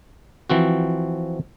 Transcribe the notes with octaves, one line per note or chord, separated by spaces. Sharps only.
E3 F3 C4 F#4